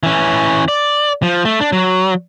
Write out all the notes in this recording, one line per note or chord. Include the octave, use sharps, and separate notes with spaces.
E3 C#4
D5
F3
A3
D4
F#3